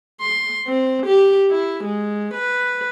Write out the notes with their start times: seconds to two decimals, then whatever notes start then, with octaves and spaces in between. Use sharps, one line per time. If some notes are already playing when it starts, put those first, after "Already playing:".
0.21 C6
0.67 C4
1.06 G4
1.51 E4
1.84 G#3
2.34 B4